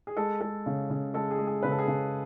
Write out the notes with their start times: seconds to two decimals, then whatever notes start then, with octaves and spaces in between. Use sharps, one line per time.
0.07 G#4
0.17 G#3 A4
0.40 G#3 A4
0.66 C#3
0.90 C#3
1.14 G#3 A4
1.31 G#4
1.38 G#3
1.47 G#4
1.63 C#3 B4
1.71 A4
1.78 G#4
1.86 C#3 A4